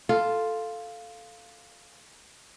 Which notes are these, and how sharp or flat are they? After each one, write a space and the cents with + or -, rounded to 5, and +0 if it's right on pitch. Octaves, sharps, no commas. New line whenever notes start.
F4 +0 A4 +0